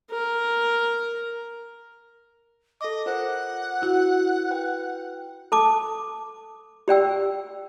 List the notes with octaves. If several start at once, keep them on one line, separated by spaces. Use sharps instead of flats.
A#4
A4 D#5 D6
F4 A#4 C5 F#5
E4 F#4
B4 G5
A4 A5 D6
G4 D5 G5 E6